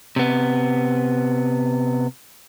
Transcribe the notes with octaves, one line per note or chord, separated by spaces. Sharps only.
C3 B3